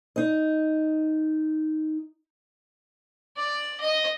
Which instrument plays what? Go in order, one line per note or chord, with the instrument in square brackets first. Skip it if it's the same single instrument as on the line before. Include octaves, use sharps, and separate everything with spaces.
[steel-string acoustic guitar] D#4 D#5
[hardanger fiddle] D5
D#5